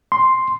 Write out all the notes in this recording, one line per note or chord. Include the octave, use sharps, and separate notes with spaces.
C6